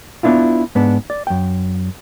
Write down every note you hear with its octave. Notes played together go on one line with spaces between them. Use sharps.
B3 C4 D4 E4 F4
G#2 B3 D4
D5
F#2 G5